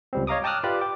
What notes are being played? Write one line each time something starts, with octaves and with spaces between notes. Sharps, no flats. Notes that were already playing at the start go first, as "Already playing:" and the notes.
C#2 G3 C4
C#5 D#5 F5 A#5 D6 D#6
G5 A5 D6 D#6 F6 F#6
F4 G4 B4 D5
G5 D6